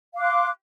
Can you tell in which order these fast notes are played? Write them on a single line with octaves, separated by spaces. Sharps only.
F5 D6 F#6 C6